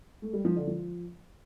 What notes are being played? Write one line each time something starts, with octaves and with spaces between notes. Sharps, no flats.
A3
G3
F3
D3
F3